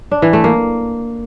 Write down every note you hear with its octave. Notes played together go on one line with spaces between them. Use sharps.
D4
E3
A3
A#3